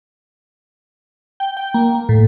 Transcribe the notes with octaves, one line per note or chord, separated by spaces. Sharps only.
G5
G5
A#3
A#3
A2